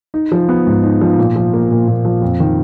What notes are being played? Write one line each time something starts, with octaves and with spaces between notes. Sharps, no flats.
D#4
F3
B3
G#2
D#4
F3
A#2
F3
A#3
A#2
A#2
F3
F2
D#3